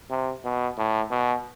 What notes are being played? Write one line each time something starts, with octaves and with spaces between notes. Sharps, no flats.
C3
B2
A2
B2